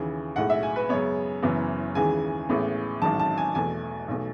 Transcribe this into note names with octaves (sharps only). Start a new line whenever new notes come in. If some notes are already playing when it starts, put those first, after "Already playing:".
Already playing: D#2 C#3 E3
B1 A2 G#3 F#5
E5
G#5
B4
F#2 C#3 G#3 B3 C#5
F#1 F#2 E3 B3
D#2 C#3 E3 G#3 G#5
A1 A2 G#3 B3
A1 G#2 D#3 F#3 A5
A5
G#5
E2 B2 A3 G#5
B1 B2 A3